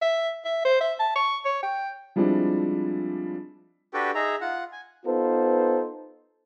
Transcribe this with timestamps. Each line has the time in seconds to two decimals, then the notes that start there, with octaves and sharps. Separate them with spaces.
0.01 E5
0.45 E5
0.65 C5
0.81 E5
0.99 A5
1.16 C#6
1.45 C#5
1.63 G5
2.16 F3 G3 G#3 C4 D4 E4
3.93 D4 F#4 G4 A4 B4 G5
4.15 D#4 G#4 E5 A#5
4.41 F4 F#5
4.72 G#5
5.06 B3 D#4 F4 A4 B4 C5